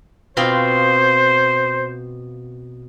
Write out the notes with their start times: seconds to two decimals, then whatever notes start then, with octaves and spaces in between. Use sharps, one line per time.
0.37 B2 C4 F4 C5